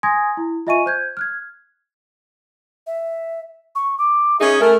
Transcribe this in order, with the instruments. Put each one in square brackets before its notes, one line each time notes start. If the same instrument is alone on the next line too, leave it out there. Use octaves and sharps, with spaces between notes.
[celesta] G#5 C6 D#6 G#6 A#6
E4
F4 D#5 E5 G#5 C#6 D#7
C5 G6 G#6
F6 F#6 G#6
[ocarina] E5
C#6
D6
[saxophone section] C#4 D#4 G#4 [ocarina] E5
[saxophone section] A3 A#4 [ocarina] G#5